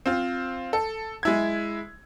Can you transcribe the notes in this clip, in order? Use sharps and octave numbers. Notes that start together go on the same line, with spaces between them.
C4 F4
A4
G#3 E4 G#6